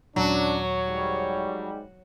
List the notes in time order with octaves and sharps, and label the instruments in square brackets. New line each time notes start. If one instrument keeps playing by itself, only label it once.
[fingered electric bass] D#2 A#2 G#3 [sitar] F#3 [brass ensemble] C#4 D4 [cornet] C#5
[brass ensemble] G#2 G3